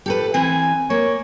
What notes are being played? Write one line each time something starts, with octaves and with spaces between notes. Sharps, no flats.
G4 A4 B4
E3 C4 G#5
A#3 C#5